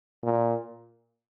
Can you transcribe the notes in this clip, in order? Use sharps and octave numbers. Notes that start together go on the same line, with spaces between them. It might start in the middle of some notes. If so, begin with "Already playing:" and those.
A#2